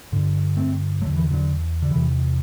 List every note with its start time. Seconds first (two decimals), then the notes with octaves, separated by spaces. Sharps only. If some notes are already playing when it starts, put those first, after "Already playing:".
0.12 G2 D3
0.57 A3 C4
1.01 D3 F#3 A3
1.05 E2
1.16 E3
1.31 D3 F#3
1.82 D3
1.91 E2 C3 E3